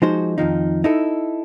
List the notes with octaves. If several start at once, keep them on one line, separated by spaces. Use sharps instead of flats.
F3 G#3 D#4 F#4 C5
F2 D#3 F3 D#4
D#4 E4 A4